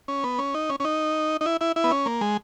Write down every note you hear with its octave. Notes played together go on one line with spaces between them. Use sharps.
C#4
B3
C#4
D#4
C#4
C#4
D#4
D#4
E4
E4
E4
B3
C#4
A#3
G#3